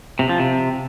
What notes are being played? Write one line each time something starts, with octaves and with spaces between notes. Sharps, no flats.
C3
F3
C3